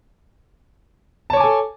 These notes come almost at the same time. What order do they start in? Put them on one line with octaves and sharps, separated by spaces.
A5 C#5 D6 G#5 A4